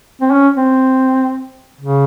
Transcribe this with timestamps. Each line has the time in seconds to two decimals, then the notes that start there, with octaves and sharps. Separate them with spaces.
0.21 C4
0.31 C#4
0.57 C4
1.81 C#3